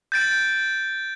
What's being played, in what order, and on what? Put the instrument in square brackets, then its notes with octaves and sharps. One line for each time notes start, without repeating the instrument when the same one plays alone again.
[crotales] G6 A6 D7